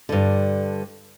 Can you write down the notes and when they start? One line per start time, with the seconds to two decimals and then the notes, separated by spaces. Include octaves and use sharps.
0.09 G2 D3